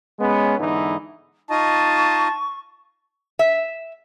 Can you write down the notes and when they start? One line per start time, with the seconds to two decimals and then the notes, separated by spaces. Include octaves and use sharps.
0.19 G#3 B3 C#4
0.59 G#2 D3 E3 B3 D#4 E4
1.50 D#4 F4 D#5 A5 C#6
3.39 E5